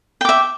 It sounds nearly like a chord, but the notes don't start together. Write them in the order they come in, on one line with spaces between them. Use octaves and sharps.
G5 D6 E5